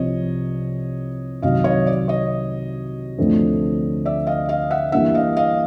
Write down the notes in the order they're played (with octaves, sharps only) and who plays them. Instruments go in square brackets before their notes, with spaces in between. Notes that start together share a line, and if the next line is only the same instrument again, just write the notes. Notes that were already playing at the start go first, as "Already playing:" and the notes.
Already playing: [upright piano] C2 C3 F3 [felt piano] C#5 D#5
[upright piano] C2 C3 D#3 F#3 [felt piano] D#5 F5
[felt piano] C#5 D#5
D5
C#5 D#5
[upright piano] D2 D3 F3 A3 C4
[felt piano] D5 E5
D#5 F5
D#5 F5
E5 F#5
[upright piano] E3 G3 A#3 D4 [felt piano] E5 F#5
[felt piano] D#5 F5
D#5 F5